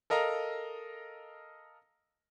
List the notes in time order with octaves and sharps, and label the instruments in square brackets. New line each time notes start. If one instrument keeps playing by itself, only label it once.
[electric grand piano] A4 A#4 D#5 F5 A#5